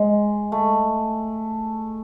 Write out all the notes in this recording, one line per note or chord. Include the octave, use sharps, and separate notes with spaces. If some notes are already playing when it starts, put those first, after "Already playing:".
Already playing: G#3
A3